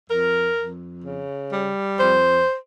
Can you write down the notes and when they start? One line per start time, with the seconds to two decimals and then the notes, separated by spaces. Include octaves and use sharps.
0.09 F2 A#4
0.56 F2
1.04 C#3
1.51 G3
1.99 F2 C5